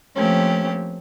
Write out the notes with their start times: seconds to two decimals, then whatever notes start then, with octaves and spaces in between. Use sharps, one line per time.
0.15 F3 A3 A#3 C4 C#4 G4